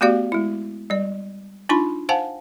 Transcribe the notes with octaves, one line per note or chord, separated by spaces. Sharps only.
A3 B3 F#4 G4 D5 F5
G#3 E4
G3 D5
D4 D#4 F4 B5 C6
C5 F5 F#5 G#5 A5